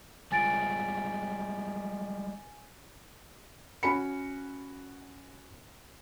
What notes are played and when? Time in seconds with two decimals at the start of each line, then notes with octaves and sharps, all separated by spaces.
0.32 G3 G#3 F4 G#5 A6 D7
3.83 C#4 F#4 B5 C#7